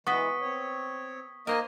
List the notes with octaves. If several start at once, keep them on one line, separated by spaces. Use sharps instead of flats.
E3 G#3 B3 F#4 C#6 D#6 B6
C4 C#5
A#3 A#4 C5 D#5 G#5